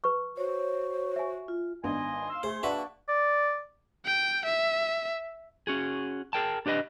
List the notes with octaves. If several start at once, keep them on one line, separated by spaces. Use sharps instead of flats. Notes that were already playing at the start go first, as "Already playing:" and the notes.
B4 C#6
F#4 C5 C#5
E5 G#5
F4
G#1 B3 D4 D#5 G#5 C6
F5 E6
A3 G#4 C5
A#3 D4 F#4 B4 D5 E5 F#5 C#6
D5
G5
E5
C#4 F#4 G#4
G#4 A#4 G5 A5
D4 G4 B4 D#5